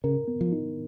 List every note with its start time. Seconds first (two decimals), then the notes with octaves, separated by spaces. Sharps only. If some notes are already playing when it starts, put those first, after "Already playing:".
0.04 C#3 A#4
0.28 B3
0.41 F3
0.52 D#4